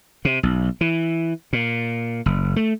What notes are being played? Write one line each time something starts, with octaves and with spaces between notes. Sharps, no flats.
C3
B1
E3
A#2
F#1
A3